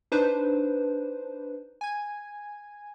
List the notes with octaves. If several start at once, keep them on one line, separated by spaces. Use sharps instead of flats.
D4 D#4 B4 C5
G#5 G#6